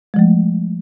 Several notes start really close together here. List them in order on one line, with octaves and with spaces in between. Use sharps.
G#3 F3 A3